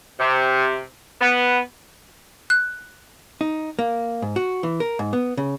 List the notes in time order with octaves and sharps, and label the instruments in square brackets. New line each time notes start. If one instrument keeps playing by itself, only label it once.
[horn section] C3
B3
[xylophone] F#6
[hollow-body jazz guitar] D#4
A#3
G#2
F#4
E3
A#4
G#2
B3
C#3